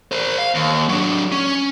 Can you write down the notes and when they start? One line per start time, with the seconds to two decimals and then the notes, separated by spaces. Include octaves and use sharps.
0.12 A#4 C5
0.38 F5
0.55 D#2
0.89 F#3 D4
1.32 C#4